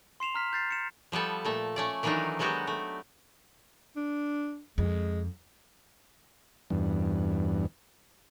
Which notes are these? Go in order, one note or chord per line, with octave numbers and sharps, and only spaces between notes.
C6 C7 E7 F7
A#5 F6 B6
G6 A6 C7
C#7 E7
F3 G3 B3 A4
A#2 A3 A4
A3 C#4 D5
D#3 E3 F#3 A3 D4 D#4
F#3 G#3 B3 F#4 G4
A3
D4
F2 G#3
E2 G2